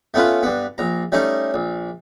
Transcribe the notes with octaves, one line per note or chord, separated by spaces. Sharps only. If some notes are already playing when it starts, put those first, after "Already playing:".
A3 B3 C#4 F4 B4
G2 B3
A#1 A#5
G3 A3 C#4 D#4
A#1